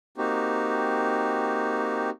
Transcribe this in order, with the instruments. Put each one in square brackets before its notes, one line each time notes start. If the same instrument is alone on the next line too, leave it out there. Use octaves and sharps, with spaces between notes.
[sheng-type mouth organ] A#3 C4 D#4 F#4 G4